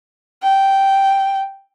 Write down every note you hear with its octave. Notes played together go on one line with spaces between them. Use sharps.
G5